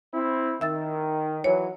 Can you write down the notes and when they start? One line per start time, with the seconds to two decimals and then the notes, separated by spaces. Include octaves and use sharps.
0.14 C4 E4
0.61 D#3 E5 E6 A6
1.44 E3 F#3 C#5